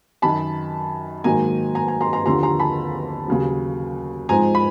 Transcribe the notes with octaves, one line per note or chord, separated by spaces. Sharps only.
F#2 D#3 F#3 A5 B5
G#2 D#3 F#3 A#3 G#5 A#5
G#5 A#5
G#5 A#5
A#5 C6
A#5 C6
D#2 D3 F3 A#5 C6
A#5 C6
A5 B5
D#2 C#3 F#3
G#2 F3 G#3 C4 D#4 G#5 A#5
B5